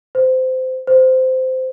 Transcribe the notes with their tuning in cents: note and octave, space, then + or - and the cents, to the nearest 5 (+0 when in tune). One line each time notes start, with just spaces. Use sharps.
C5 -20
C5 -15